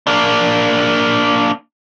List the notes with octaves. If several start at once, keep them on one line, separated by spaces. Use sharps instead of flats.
A#3 D4